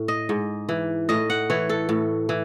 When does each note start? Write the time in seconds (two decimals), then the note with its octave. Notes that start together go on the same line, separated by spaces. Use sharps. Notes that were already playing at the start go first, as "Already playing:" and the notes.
Already playing: A2
0.08 D#5
0.29 G#2
0.69 E3
1.09 A2 D#5
1.30 F#5
1.50 E3 C#5
1.69 A4
1.89 A2
2.29 E3